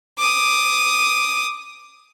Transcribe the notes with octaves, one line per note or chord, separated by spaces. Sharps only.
D6 D#6